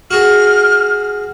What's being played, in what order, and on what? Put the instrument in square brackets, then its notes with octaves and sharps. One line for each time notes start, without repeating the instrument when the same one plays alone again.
[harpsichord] F#4 G#4 [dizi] F6